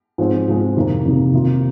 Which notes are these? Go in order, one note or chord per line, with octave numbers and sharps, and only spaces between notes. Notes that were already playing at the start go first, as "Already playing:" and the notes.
G#2 F3 G#3 C4
G#2 F3 G#3 C4
F2 C3 D#3 A#3
F2 C3 D#3 A#3
C3 D#3 A#3 F4